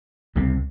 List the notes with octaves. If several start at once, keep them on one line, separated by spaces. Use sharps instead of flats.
C#2 C3 G3 C4